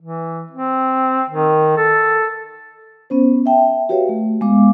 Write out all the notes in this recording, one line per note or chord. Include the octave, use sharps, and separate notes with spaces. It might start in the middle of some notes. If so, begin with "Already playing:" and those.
E3
C4
D#3
A4
B3 C#4 C5
E5 G5 A5
F#4 G4 B4 C#5 E5 F5
A3
G#3 B3 F5 D6